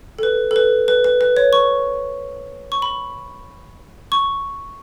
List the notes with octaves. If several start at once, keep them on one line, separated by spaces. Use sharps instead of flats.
A4
B4
A4
B4
B4
B4
B4
C#5
C#6
C#6
B5
C#6